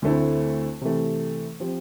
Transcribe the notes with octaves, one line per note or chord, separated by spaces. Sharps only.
D2 D3 A3 C4 E4
C3 E3 A3
F3 C4 G4